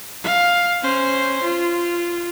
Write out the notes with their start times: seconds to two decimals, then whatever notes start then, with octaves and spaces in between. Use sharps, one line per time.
0.24 F5
0.82 C#4 C5
1.43 F4